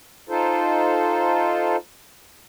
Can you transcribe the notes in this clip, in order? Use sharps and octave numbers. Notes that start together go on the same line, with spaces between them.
D#4 F4 A4 C5